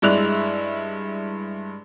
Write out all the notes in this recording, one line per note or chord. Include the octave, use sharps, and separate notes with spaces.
G2 G#3 E4 D5 F#6 F7